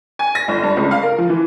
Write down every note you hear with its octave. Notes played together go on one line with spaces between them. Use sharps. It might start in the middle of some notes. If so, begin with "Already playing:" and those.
G#5
A#6
G1
G2
C#2
F5
A#4
F3
E3